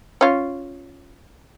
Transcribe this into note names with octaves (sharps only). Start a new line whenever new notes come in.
C#4 F4